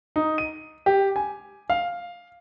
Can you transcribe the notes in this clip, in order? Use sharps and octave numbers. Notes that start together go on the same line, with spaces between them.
D#4
D#7
G4
G#5
F5